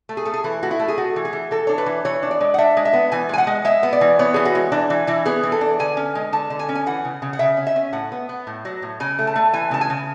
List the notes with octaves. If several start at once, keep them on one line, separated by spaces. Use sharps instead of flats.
A3
G#4
A3 A4
G#4
E3 E4
A3 F#4
E4
A3
G#4
A3 F#4
E3
G#4
E3
E3 A4
D4 C#5
B4
E3
E3 C#5
D4
D5
G#3
F#5
D4 E5
G#3
E5
B3
E3 G#5
G#3 G#5
F#5
G#3
G#3 E5
B3
D5
E3
B3 C#5
E3 G#4
F#4
G#3
E3 D4
E3
E3 E4
B3 G#4
E3
A4
D4
D3 G#5
C#4
G#3
D3 A5
D3
G#5
C#4
G#5
E3 F#5
C#3
C#3
F#5
C#3 E5
C#4
E5
C#4
A2 F#5
B3
B3
A2
F#3
A2
C#3 G#5
A3
A5
A3
E3 G#5
C#3 A5
G#5
C#3